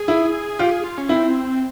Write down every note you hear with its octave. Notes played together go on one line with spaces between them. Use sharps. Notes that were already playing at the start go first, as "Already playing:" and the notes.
Already playing: G#4
E4
F4 G4
G#4
F4
C#4
C4 E4